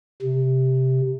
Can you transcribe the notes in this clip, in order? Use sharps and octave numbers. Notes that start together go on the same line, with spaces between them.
C3